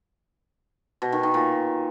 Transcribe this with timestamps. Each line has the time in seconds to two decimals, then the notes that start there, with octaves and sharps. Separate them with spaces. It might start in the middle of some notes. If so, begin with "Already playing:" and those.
1.02 B2
1.13 D#3
1.23 D#3
1.34 A#2